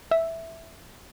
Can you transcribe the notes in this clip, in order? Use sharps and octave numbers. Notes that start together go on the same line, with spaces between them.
E5